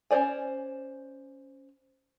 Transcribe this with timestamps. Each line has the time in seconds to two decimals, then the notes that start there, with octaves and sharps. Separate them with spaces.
0.11 C#4 E4 C5 D5 G#5